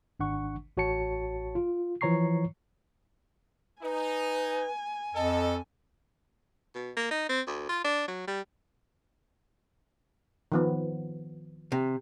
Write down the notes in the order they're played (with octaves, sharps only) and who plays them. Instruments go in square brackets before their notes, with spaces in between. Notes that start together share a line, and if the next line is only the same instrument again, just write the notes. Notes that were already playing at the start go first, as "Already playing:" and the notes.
[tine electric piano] G#1 D4 F#5 C#6
A1 F#4 C#5 A5 C#7
F4
E3 F3 C#5 A#5 C#6 C7
[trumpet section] D#4 [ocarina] B4 [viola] G#5
[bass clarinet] F2 [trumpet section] A4 [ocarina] D#5
[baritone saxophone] B2
A#3
D#4
C4
D2
F4
D4
F#3
G3
[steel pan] D#3 F3 B3
[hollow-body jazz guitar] C3